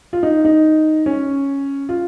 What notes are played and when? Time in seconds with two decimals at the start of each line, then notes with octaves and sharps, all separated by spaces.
0.13 F4
0.23 D#4
0.45 D#4
1.06 C#4
1.89 F4